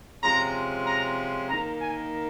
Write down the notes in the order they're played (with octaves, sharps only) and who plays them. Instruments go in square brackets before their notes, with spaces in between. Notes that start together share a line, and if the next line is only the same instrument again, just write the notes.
[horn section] C3 F3 G#3 C#4 A#5
A#5
D#3 A#3 D#4 A#5
G#5